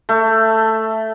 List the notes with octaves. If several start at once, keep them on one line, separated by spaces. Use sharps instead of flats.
A3